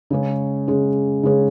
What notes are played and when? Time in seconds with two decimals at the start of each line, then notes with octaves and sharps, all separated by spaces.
0.10 C#3 G#3 C#4
0.68 C#3 G#3 C#4
1.23 C#3 G#3 C#4